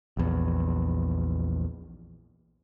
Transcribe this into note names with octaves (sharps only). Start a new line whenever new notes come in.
A#1 E2